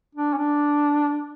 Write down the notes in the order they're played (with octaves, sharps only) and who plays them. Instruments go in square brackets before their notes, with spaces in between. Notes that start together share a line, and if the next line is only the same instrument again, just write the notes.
[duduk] D4
C#4
D4